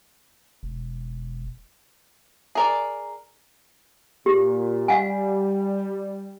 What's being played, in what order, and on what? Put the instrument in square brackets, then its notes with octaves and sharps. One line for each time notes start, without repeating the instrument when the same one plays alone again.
[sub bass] E1
[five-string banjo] G#4 A#4 D5
[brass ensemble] A#2 [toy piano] G4
[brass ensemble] G3 [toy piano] F5 F#5 G#5